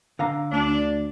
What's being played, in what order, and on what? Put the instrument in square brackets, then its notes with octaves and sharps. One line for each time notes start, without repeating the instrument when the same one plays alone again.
[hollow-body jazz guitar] D3 F5 A#5
[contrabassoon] D2 [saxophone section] D4